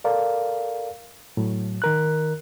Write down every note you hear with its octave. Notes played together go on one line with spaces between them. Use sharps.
A4 A#4 D5 F5
A2 F#3
D#3 A#4 F#6